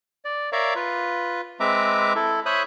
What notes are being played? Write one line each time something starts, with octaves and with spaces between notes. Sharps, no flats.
D5
A#4 C#5 D5 E5 F5 A#5
F4 B4
G#3 C4 B4 E5 A#5 D6
E4 A4
C5 C#5 E5 B5 D#6 F#6